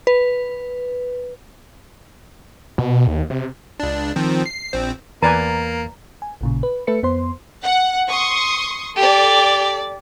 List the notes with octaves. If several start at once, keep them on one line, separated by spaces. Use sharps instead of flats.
B4
B2
D#2
C3
C#2 D4
D#3 F3 C4
C7
A#1 C4
E2 A#3 B4 D5 G#5 A#5 A6
G#5
A1 A#2 C#3
B4
A3 A4 B4 E5 C#7
F2 B3 C5 C6
F#5
C6 C#6 D#6
G4 A4 D5